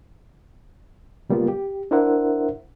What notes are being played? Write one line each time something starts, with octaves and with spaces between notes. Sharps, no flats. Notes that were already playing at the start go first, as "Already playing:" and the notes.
C#3 G3 A#3 B3 F4
G4
D4 E4 A#4 C5 E5 F#5